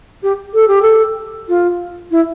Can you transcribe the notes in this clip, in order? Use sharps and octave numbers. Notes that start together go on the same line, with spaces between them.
G4
A4
G4
A4
F4
E4